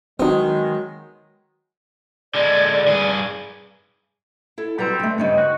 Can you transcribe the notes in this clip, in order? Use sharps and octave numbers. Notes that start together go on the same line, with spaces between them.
D#3 F#3 G#3 B3 C4 D#4 D6
D3 G#3 D5
G2 G#4
E4 A4
F#3 G3 C4 B4 A#5
D3 A3
G2 C#3 B3 C4 D#4
F#4